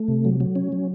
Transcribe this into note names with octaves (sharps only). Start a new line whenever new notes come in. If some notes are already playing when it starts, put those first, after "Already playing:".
Already playing: A3
C3
F#3
F#3
C#4
F#3